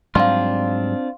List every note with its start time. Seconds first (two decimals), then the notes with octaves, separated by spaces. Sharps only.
0.15 G#2 F#3 G3 C4 D4 F4 F5 C6